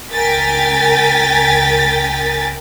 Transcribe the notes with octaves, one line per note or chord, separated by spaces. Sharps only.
C#2 A#4 G5 G#5 A6 B6